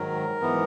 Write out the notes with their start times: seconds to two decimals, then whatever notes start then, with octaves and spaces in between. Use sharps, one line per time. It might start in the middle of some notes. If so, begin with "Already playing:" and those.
Already playing: G#2 D#3 F#3 A#4
0.40 G#2 E3 B3